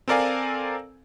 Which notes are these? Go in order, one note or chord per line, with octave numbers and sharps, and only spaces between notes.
C4 A4 A#4 D5 F5 G#5